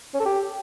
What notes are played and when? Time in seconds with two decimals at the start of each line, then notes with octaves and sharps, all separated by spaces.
0.14 C#4
0.20 A4
0.26 G4